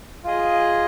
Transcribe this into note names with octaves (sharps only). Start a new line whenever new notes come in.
F4 G#4 D#5